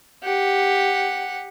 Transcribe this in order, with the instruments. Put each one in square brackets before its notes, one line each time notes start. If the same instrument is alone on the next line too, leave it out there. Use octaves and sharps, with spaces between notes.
[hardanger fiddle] G4 F#5